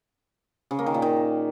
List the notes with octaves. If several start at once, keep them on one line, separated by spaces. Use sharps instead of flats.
C#3
A#3
D#3
A#2
D#3